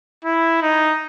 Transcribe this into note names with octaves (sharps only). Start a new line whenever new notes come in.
E4
D#4